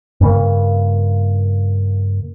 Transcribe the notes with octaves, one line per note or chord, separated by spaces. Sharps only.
G2 C#3 A#3